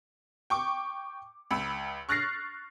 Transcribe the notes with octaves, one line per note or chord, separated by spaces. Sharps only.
G5 C#6 D6
C#2 B5 E6
C#6 F6 F#6 A6 A#6 C7